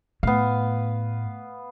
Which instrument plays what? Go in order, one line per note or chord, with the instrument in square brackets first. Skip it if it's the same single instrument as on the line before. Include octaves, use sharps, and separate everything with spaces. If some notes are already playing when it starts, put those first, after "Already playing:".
[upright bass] A2 [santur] B3 F5